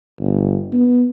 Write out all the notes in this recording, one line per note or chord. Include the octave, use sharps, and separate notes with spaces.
G1
B3